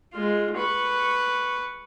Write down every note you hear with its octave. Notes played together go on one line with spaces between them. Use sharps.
G#3 F4
B4 C#6